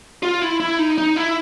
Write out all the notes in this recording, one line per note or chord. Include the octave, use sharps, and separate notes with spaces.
F4
E4
E4
D#4
D#4
E4